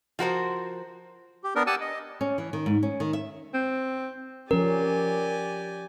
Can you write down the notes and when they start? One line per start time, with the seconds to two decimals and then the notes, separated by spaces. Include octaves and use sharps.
0.19 F3 F#4 A#4 C5
1.44 G4
1.55 B3 D4 A#4
1.67 G4 F#5 G#5 A5 E6
1.81 D#5
2.21 C#4
2.38 E3
2.53 D#3
2.66 G#2
2.83 C#4
3.00 D#3
3.13 E5
3.54 C4
4.51 F3 C#4 G4 A#4 D5 G#5